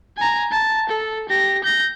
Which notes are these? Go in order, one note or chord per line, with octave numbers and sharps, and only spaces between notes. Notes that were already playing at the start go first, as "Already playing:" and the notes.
G#5 A#5
A5
A4
G4 A#6
G6 A#6